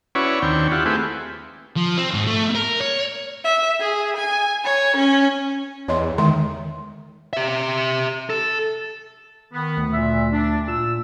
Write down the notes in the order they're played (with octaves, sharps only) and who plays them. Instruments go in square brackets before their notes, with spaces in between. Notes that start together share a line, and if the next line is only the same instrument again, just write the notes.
[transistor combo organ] C#4 E4 F#4 B4 C#5 D5
D#2 C4 D4 C#5 G5
E4 F4 G4 F#5
A3 C4 E4 G4 G#4 B4
[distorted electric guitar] F3
C4
G#2
A3
A#4
C#5
[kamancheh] E5
G#4
G#5
C#5
C#4
[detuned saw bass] E2 [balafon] C#5 D#5 C6
[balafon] D3 G#3 C6 [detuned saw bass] D#3
[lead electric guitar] G4 E5
A4
[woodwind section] D#3 B3
[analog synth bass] D2
[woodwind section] A#2 E5
D4
[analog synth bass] A#2 [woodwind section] E6